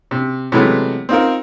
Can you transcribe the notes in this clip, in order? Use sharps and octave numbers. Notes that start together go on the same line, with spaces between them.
C3
C3 E3 F#3 G#3 A3 B3
C4 D#4 F4 A#4